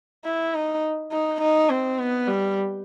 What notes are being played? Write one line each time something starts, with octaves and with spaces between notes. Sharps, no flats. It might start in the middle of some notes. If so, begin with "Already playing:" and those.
E4
D#4
D#4
D#4
C4
B3
G3